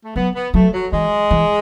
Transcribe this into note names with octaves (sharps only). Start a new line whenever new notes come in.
A3
F#3 B3
B3
F#3 A3
F#3
E3 G#3
E3